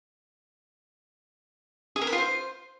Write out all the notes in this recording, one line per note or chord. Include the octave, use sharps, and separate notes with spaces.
G#4
A#4
B4
F4
C5